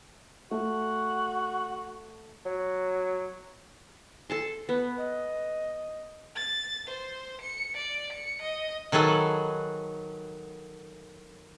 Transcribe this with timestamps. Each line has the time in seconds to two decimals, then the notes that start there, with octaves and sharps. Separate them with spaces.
0.51 A3 F#4
2.45 F#3
4.30 A4 A5 C6
4.69 B3 B4
4.99 D#5
6.36 A6
6.88 C5
7.42 C#7
7.77 D5
8.13 C#7
8.42 D#5
8.92 D#3 F#3 G#4 A4 B4